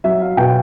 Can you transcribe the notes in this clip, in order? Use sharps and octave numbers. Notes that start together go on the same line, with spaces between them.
F#3 E5
F5
B2 G5